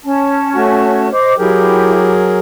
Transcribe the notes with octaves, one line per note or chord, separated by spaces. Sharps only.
C#4 A5
A3 F#4
C5 D#5 D6
F#3 E4 G4 G#4 A#4